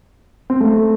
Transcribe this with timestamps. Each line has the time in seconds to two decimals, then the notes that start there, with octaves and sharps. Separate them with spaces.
0.50 C4
0.60 A3